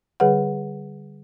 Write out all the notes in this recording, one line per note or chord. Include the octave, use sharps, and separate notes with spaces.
D3 G3 G#4 B4 C#5 F#5